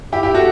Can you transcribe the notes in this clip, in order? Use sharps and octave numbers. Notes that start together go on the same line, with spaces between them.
E4 G4
E4 G4
F#4 A4